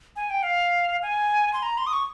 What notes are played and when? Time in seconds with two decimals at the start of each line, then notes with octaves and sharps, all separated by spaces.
0.16 G#5
0.30 G5
0.43 F5
1.02 G#5
1.53 C6
1.63 A#5
1.78 C6
1.87 D#6
1.93 C#6